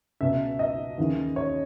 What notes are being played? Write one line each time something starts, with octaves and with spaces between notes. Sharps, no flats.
C#2 B2 E5
D#5
D#2 C#3 E3
C#5